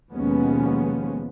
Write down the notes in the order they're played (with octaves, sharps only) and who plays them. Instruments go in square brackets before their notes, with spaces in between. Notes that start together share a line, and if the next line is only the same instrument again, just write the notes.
[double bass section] D#2 B2 F3 G#3 B3 C#4